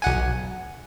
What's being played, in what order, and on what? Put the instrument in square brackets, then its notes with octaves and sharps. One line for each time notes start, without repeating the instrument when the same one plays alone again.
[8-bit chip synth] B1 F#5 G#5